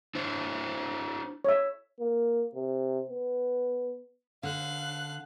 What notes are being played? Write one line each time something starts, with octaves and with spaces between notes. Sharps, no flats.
D4 E4 C5
C#5 E5
A#3
C3
B3
D3 F5 F#6